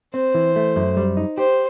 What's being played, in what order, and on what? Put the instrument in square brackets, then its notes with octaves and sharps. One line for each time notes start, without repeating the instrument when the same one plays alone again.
[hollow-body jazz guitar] C4 [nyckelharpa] C5
[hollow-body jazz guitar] E3
A3
F#2
G3
D#4
[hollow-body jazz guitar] G4 [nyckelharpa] C5